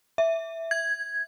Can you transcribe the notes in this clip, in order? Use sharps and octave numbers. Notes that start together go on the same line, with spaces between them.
E5
G#6